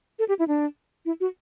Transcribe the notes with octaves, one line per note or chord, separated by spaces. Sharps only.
A4
G4
E4
D4
E4
F#4